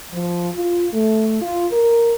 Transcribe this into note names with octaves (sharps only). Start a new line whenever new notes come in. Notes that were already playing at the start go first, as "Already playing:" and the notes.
F3
F4
A3
F4
A#4